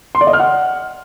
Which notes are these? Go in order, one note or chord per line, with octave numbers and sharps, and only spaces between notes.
C6
D5
D#5
F6
F#5